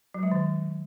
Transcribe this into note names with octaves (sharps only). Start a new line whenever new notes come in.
F#3
G#3
D#3